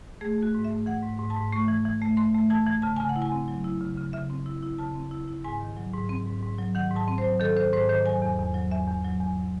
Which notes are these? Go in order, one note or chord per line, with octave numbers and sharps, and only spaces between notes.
A3 G#4
A3 F#4
G#2
E5
A3
E3 F#5
G#2
G#2
A5
G#2
A3 C#6
E3
E3
A3
A3 C6
A3
E3 A5
E3
C#3 A5
C#3 G#5
F#5
E4
G#5
C4
F#3
E4
C#3
C#3
C#3 E5
C4
E4
E4
C#3 A5
C4
E4
E4
G#2 G#5
D#3
F#3
G#2
C4
G#2
G#2
F#3
D#3 F#5
G#2 A5
C4
C5
F#3
D#3 A4
D#3 C5
G#2 C5
D#3 C5
F#3 G#5
E2
E2
F#3
E2 E5
E2
F#3
E2
F#3